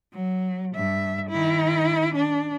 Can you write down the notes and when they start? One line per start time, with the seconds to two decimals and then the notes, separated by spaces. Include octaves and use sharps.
0.14 F#3
0.76 G2 E5
1.30 D#3 E4
2.15 D4